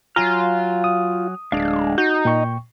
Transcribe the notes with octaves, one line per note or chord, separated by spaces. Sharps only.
F#3 F4 G#5 A#5 F6
D#6
D1 G#3 D4 F5
D#4 F#4 G6
A#2 G5 C#6